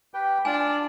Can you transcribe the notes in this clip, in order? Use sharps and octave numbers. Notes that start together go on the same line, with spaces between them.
G4 B4 G5
D4 F4 G#5 A5 D6